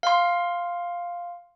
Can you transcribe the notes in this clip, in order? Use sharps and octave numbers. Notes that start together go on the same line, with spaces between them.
F5 C6